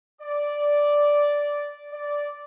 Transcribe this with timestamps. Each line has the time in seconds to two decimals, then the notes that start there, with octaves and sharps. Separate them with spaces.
0.22 D5
1.92 D5